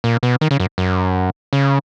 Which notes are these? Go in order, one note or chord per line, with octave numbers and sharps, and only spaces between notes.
A#2
B2
D#3
C#3
F#2
F#2
C#3